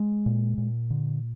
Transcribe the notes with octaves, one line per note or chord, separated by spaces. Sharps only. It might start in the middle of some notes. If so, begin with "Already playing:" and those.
Already playing: G#3
A#2
A#2
D3